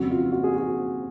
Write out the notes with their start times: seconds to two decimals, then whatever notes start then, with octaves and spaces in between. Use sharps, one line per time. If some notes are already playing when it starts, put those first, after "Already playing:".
Already playing: F2 C#3 F#3 F#4
0.10 F4
0.32 F#4
0.43 G#4
0.54 F#4